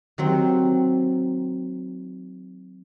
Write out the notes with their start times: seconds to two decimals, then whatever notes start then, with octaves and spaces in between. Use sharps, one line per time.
0.18 D#3 F#3 C4